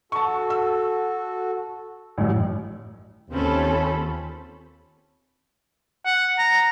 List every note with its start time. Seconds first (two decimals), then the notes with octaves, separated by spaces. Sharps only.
0.12 F#4 A4 A5 C#6
0.50 E6
2.18 A1 F#2
3.31 D#2 C4 C#4 F4 A4 B5
6.06 F#5
6.38 A#5